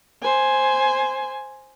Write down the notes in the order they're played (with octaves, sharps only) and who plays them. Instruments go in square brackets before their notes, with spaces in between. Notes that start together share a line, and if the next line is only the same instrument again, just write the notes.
[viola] C5 G#5